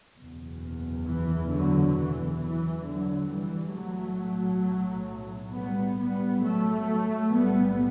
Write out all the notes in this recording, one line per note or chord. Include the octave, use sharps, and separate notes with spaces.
F#1 E2 B2
E3
D3 F#3
E3
E3
D3 F#3
E3 G3
B1 A2 F#3 A3
G3 B3
G3 B3
F#3 A3
B1 A2 G3 B3